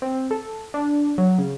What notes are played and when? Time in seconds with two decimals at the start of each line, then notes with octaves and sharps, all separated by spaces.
0.02 C4
0.31 A4
0.74 D4
1.18 F#3
1.38 C#3